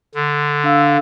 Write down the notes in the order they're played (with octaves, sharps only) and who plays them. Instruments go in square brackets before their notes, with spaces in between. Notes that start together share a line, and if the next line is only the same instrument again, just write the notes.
[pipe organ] D3
[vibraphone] D4 F5 E6